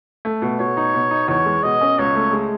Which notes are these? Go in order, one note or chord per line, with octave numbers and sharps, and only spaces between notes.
A3
B2
B2 C#5
D#4
B2
D#4
E2 C#5
G#3
B2 D#5
C#4
C#2 C#5
A3
G#3